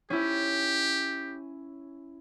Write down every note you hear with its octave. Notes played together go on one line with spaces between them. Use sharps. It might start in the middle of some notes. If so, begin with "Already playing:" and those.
C#4 E4 G4